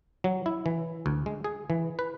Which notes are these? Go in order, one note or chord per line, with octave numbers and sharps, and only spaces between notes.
F#3
E4
E3
D2
G#3
G#4
E3
B4